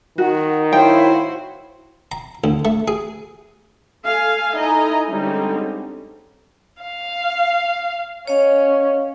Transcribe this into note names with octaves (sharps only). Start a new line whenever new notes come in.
D#3 F#4 F#5
E4 F#4 C5 C#5 F5 G5
A#5
D2
A3
G#4
A4 F5 G#5
D#4 E4 A4 D#5 G#5 A#5
D3 G3 G#3 C4 C#4 D#4
F5
C#4 C#5 D#5 F5